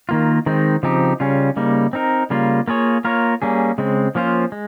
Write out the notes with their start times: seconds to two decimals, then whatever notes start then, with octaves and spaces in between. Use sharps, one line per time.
0.09 D#3 A#3 F4
0.46 D#3 G#3 C4 D#4
0.83 C#3 F3 C4 D#4 G4
1.20 C#3 G3 C#4 F4
1.56 C#3 G3 A#3 D#4
1.93 C4 D#4 A#4
2.30 C#3 G3 A#3 F4
2.68 A#3 F4 G#4 C#5
3.05 A#3 F4 A#4 C#5
3.42 G3 A#3 C#4 G#4
3.78 C#3 G#3 C4
4.15 F3 A#3 C#4 F4 C5
4.52 G#3